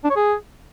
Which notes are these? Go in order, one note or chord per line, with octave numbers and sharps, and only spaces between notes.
D4
C#5
G#4